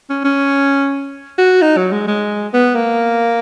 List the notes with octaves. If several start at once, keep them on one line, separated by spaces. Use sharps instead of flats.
C#4
C#4
F#4
D#4
F#3
G#3
G#3
B3
A#3